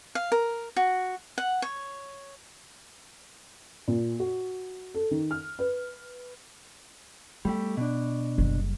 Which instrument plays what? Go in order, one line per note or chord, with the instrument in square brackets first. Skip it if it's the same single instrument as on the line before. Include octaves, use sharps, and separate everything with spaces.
[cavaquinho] F5
A#4
F#4
F#5
C#5
[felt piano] A#2
F#4
A4
D#3
F6
B4
[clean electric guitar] G3 A3 G4 [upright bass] B3
[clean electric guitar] B2 D4
[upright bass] F#1 G3